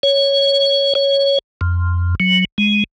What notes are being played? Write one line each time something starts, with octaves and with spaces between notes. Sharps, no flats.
C#5
C#5
F2
F#3
G#3